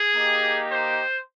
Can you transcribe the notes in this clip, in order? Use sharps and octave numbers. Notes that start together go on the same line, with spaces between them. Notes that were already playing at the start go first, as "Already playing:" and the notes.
Already playing: G#4
A#3 D#4 G4
C5